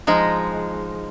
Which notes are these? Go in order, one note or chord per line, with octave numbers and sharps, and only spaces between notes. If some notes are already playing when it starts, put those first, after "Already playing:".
F3 G#3 D#4